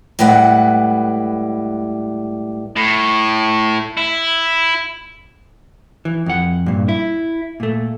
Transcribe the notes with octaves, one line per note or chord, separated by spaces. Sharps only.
A2 G3 G#3 B4 F#5
A2
E4
E3
F2 F#5
G2 A#2
E4
A#2 A3